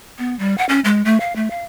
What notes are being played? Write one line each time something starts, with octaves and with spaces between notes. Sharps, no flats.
B3
G3
F#5
C#4
G#3
A3
F5
A3
F5